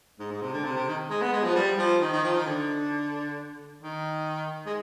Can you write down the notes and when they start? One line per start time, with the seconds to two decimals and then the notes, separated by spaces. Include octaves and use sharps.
0.19 G#2
0.31 G#2
0.42 C3
0.53 D3
0.64 C3
0.76 C3
0.88 D#3
1.10 G#3
1.21 B3
1.33 G#3
1.44 F3
1.55 G3
1.78 F3
2.01 D#3
2.12 D#3
2.23 F3
2.34 D#3
2.46 D3
3.83 D#3
4.66 G#3